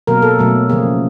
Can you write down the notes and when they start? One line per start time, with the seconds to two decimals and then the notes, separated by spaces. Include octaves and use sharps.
0.07 B2 F#3 A#3 A#4
0.22 A4
0.39 B2 F#3 A3
0.69 C#3 F3 A#3 G#4